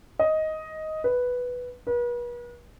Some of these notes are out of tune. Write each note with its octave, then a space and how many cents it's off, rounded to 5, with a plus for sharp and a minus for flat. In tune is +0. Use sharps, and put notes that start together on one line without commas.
D#5 +10
B4 +0
B4 -40